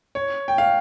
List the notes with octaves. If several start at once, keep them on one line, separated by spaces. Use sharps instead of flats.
C#5
G5
F5